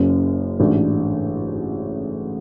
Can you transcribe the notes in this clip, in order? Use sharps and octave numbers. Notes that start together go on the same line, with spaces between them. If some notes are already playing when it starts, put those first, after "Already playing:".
Already playing: F#1 F#2 C#3
A1 G#2 F#3 A3 D4